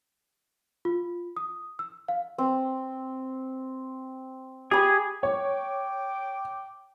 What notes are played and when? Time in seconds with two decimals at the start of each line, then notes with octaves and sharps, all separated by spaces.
0.85 F4
1.36 D#6
1.79 E6
2.08 F5
2.38 C4
4.71 G4 G#4 B5
5.23 C#5 G5 D6